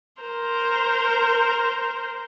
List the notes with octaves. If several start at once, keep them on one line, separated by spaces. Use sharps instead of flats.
A#4 C5